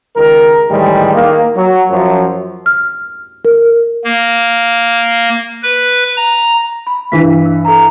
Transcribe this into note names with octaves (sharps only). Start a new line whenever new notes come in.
C#2 D#3 A#4
A2 D#3 E3 G3 G#3
D#3 A#3
F#3
F#2 F3 F#3
F6
A#4
A#3
B4
A#5
B5
G2 E3 B6
E6
A4 A#5